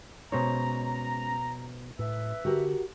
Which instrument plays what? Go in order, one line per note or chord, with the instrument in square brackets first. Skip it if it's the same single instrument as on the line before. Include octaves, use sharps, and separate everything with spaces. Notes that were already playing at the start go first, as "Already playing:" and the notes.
[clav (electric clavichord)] B2 C5 C#5 [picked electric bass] G#3 C#4 [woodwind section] A#5
[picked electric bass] A2 [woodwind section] B4 E5
[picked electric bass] D3 [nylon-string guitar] F#4 G4 A#4